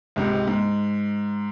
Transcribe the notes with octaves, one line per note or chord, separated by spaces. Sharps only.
C#2 G#2 C3
G#2